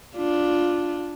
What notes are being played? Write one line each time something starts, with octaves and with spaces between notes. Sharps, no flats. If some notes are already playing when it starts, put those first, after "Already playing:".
D4 F4